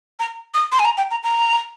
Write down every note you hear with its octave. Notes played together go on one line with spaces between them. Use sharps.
A#5
D#6
C6
G#5
A#5
G5
A#5
A#5